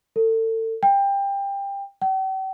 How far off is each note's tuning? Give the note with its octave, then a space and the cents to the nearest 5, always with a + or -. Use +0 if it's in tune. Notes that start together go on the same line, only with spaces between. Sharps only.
A4 +30
G5 +20
G5 -45